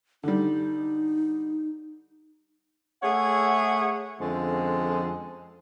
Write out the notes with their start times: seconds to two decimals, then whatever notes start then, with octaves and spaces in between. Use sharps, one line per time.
0.23 D3 G3 D#4
3.03 A3 G#4 C#5 E5 F#5
4.20 F2 D3 F3 G#3 C4 C#4